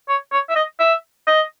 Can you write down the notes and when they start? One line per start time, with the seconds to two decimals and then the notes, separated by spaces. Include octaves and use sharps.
0.09 C#5
0.32 C#5
0.49 E5
0.55 D#5
0.79 E5
1.27 D#5